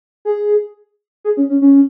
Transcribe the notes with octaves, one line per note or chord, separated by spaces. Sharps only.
G#4
G#4
C#4
C#4
C#4